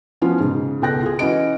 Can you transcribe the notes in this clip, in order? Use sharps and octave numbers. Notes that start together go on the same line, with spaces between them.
E3 F3 B3 C#4 F4 F#4
G#2 C#3
C#2 B2 A4 G5 F#6 A#6
F4 G#4
E3 C#4 F#4 D#5 D7